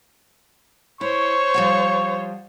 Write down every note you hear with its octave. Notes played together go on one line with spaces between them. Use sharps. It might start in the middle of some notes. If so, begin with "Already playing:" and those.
E4 C5 C#5 C#6
F3 G3 F#5